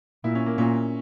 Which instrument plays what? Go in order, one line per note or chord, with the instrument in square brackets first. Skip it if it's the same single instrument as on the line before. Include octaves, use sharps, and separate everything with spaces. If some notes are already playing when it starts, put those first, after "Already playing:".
[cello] A#2 [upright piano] E4
[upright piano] C#4
A#3
[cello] A#2 [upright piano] C#4